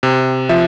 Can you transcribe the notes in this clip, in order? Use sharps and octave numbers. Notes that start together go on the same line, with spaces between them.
C3
F3 E5